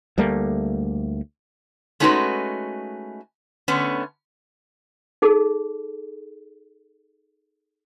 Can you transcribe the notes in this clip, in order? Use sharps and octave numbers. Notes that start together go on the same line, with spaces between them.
D2 G3 A3 A#3
G#3 A3 C#4 D#4 F#4 B4
D3 A3 B3 C#4
D#4 G#4 A4